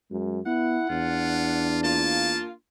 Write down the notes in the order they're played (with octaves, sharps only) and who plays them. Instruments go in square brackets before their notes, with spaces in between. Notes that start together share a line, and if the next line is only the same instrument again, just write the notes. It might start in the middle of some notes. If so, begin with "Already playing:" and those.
[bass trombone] F#2 [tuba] G#3
[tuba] B3 [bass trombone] E4 [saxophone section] F#5
[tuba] E2 [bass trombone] D4 [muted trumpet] F4
[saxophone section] A#3 F4 [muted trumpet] A5